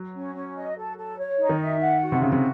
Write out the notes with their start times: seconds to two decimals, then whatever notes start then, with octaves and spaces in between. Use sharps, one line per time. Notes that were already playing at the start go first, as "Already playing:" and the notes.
Already playing: F#3
0.14 C#4
0.34 C#4
0.55 D#5
0.77 A4
0.97 A4
1.17 C#5
1.39 D#4
1.49 D#3
1.60 E5
1.80 F#5
2.01 F#4
2.12 C3
2.22 C#3 F#4
2.32 C3